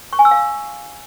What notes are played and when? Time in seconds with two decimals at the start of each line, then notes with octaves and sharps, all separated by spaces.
0.13 C#6
0.19 G#5
0.25 E6
0.31 F5